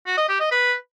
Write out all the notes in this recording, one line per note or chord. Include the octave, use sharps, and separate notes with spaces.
F#4
D#5
G4
D#5
B4